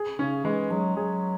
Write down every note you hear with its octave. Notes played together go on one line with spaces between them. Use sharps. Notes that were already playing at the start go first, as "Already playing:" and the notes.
Already playing: G#4
C#3 C#4
E3 G#3
F#3 G#3
F#3 G#4